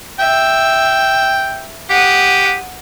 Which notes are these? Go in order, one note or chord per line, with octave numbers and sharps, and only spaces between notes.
E5 G5
G4 F#5 D#6